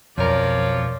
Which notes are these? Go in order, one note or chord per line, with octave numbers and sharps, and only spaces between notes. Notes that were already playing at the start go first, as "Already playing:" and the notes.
B1 F2 F3 A#4 C#5 D5